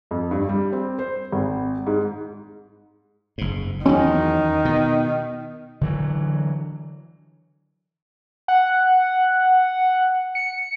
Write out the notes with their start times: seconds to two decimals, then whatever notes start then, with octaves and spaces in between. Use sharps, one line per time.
0.11 F2
0.31 G2
0.49 G3
0.73 C4
0.99 C5
1.32 G#1
1.86 G#2
3.38 F#1 G#2
3.86 E2 D#3 F#3 C#4
4.65 B2
5.81 D3 E3 F#3
8.48 F#5
10.35 C#7